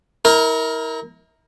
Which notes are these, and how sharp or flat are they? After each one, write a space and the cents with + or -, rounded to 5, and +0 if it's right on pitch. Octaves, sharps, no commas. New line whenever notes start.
E4 -40 A#4 +0